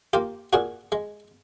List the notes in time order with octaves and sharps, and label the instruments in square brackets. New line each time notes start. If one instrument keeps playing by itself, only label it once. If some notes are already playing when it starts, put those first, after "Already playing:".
[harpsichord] A#3 F4 G4
A#2 F#4 G#4
G#3